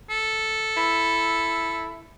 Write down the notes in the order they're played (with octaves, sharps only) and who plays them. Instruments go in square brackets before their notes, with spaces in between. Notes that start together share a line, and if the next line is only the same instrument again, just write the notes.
[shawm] A4
[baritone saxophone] E4